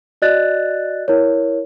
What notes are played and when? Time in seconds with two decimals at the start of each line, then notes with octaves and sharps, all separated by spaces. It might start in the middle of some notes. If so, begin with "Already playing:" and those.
0.22 F#4 D5 D#5 F#6 A6
1.08 E4 A#4 C#5